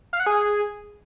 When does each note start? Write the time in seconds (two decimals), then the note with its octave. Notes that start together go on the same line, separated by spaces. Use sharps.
0.13 F5
0.20 F#5
0.26 G#4